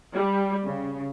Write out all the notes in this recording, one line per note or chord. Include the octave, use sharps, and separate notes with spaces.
G3
C#3